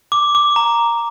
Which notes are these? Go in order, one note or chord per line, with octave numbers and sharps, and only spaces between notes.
D6
D6
A#5